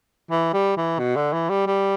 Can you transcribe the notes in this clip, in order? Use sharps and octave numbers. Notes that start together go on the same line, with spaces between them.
E3
G3
E3
B2
D3
E3
G3
G3